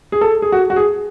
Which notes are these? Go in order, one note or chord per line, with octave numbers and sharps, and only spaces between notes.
G#4
A4
G#4
F#4
F#4
G#4